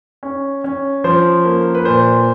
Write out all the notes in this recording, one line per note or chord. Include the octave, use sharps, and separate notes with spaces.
C#4
C#4
F3 C5
A#3
B4
A#2 C5